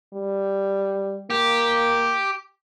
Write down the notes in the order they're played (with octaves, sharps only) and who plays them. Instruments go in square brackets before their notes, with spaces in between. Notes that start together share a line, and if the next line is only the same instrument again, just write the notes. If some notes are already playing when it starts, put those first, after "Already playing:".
[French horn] G3
[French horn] A#3 [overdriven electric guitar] G4